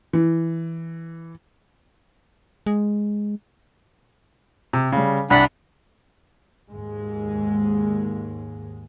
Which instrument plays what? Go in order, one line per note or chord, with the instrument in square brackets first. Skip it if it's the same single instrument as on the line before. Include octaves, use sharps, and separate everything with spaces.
[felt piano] E3
[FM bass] G#3
[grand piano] C3
C#3 G3
[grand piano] C2 [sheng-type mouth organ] D4 F#5 B5
[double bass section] D#2 G#2 G#3